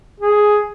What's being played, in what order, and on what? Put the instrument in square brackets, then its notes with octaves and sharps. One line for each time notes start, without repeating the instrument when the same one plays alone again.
[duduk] G#4